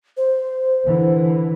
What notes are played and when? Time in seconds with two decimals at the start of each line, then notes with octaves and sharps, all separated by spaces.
0.17 C5
0.86 D3 E3